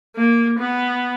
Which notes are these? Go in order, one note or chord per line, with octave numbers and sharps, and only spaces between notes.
A#3
B3